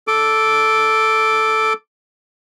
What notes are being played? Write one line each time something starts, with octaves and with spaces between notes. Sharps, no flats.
A4 D6